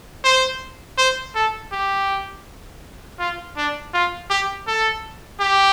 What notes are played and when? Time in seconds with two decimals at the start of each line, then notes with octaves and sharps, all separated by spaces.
0.24 C5
0.98 C5
1.35 A4
1.72 G4
3.19 F4
3.57 D4
3.93 F4
4.30 G4
4.67 A4
5.41 G4